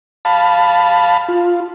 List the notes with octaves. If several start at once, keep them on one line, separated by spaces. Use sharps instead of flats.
F5 A5 B5
F4